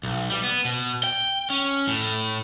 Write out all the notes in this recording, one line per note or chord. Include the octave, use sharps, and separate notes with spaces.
B1
G3
B3
B2
G5
C#4
A2